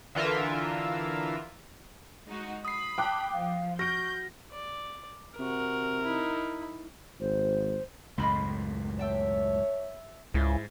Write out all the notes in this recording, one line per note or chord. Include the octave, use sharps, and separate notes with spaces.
D3 E3 F4 A#4 E5
G#3 D#4 F#4
B5 D#6 C7
G5 A5 D6 F#6
F3 F5
F#4 C#6 F6 G6 A#6 D7
D5
C3 F#4 A#4
D#4 E4
G#1 C5
C#2 F#2 A2 D#5 B5 C6
C#5 E5 G5 A5
C#2 G#2 E4